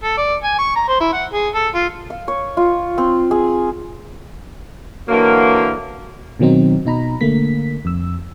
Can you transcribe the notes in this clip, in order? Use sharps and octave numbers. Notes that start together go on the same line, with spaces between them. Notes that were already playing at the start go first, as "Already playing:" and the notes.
A4
D5
G#5
C#6
A#5
C5
E4
F#5
G#4
A4
F4
F5
C#5
F4
C4
G#4
D3 E3 F#3 A#3
B2 D#3 F#3 C4 D#4
B2 D#4 A#5 B5
D3 A3 A#3 B6
F2 E6